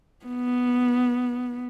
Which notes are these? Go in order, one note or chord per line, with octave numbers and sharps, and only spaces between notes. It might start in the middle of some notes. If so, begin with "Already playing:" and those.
B3